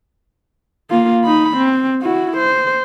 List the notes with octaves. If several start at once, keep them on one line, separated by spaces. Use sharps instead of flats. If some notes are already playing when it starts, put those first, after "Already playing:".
A#3 F4
D#4 B5
C4
E4 F#4
C5